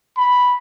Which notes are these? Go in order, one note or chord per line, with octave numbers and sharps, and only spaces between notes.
B5